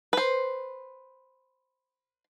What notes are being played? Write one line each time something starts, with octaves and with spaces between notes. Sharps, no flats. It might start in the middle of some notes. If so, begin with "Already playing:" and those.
B4 C5